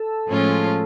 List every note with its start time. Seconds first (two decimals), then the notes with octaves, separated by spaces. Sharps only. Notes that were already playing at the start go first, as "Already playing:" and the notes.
Already playing: A4
0.28 A2 F3 G#3 C#4 F4